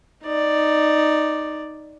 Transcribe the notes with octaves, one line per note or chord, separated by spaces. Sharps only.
D#4 D5